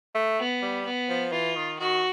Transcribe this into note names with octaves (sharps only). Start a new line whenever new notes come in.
A3
B3
G3
B3
F3
E3 F4
D#3
D#3 F#4